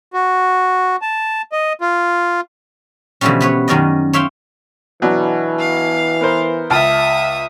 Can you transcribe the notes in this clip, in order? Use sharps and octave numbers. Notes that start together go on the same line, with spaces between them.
F#4
A5
D#5
F4
B2 D3 E3 F3 G3 C#4
B3 B4 C#5
F#2 D#3 C#4 D5 D#5
C#5 E5 F5 G5 C6
B2 E3 F#3 D4
F5
B3 A#4 C5
C#2 E5 A5 D#6 F6